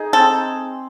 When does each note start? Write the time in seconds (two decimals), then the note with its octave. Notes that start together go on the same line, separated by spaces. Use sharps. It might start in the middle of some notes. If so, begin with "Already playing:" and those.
Already playing: D#4 G#4
0.13 C4 A4